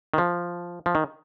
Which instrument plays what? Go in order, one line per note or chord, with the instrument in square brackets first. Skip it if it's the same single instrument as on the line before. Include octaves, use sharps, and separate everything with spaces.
[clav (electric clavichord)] D#3
F3
F3
D#3